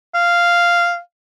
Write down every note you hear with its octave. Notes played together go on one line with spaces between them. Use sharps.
F5